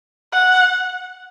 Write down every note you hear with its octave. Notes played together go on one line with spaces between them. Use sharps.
F#5